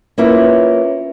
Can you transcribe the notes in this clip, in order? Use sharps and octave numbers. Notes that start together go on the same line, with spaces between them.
A#3 C#4 E4 F4 B4